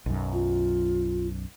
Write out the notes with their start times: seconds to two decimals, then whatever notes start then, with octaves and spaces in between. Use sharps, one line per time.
0.06 B1 F#2
0.33 F4